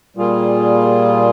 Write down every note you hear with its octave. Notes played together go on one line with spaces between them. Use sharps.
A#2 G3 A#3 F4 G#4